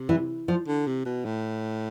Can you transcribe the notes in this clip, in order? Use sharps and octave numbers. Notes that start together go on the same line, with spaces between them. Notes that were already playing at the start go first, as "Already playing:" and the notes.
Already playing: C3
E3
F3
D3
C3
B2
A2